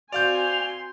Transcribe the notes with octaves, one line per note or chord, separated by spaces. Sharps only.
C4 F#4 D5 F5 G#5 C6 G6 F7